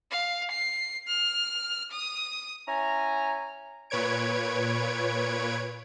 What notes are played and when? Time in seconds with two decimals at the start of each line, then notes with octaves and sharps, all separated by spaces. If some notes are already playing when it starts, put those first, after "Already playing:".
0.11 F5
0.51 C7
1.08 F6
1.91 D#6
2.67 C#4 E4 G#5 A#5
3.90 A#2 B4 C#5 G#6 D7